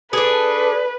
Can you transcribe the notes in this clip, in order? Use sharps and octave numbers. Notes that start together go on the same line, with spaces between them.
D4 G#4 A4 B4